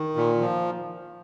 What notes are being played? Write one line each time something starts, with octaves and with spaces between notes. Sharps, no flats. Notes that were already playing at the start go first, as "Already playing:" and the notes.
Already playing: D#3
A#2
F3